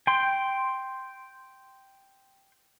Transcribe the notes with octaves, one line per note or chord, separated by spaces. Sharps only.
G5 C6